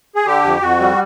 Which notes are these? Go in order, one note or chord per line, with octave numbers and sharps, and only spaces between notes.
G#4
D3 G4
F2
F2 F#4
G3